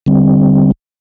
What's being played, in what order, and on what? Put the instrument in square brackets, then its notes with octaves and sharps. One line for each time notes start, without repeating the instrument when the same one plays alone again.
[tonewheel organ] D3 G3 C4